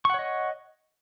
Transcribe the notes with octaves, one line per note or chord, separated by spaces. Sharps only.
C#5 D#5 F#5 C#6